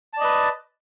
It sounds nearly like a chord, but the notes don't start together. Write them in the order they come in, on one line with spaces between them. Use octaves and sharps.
A5 D5 D#5 B4